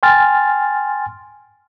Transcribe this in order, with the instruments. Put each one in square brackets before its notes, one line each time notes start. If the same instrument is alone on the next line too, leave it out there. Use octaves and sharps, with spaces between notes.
[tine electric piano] G5 G#5 C6 F6 A6